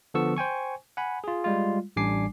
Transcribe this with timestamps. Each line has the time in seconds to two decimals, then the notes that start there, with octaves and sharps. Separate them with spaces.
0.14 D3 F3 B3 A4 C#6 E6
0.36 C5 G5 G#5 C#6
0.97 F#5 G#5 B5
1.24 F4 G#4
1.44 G3 G#3 F4
1.96 A1 G3 D4 G#5 D6 C7